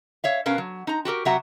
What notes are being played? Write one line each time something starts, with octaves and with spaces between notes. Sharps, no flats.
C#5 E5 F5
B2 C#4 A#4 B4 F5
F#3
D#4 A#5
F#4 G4 A4 A#4
C3 F#3 F#4 E5 F#5 A#5